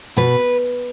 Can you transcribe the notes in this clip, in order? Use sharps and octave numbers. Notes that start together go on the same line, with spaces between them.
B2 B4